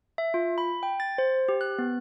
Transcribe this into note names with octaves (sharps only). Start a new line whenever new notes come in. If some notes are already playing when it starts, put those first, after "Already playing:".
E5
F4
B5
G5
A6
C5
G4
F#6
B3